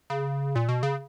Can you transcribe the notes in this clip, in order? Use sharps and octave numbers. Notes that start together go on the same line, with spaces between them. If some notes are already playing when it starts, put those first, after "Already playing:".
C#3
A#2
B2
C#3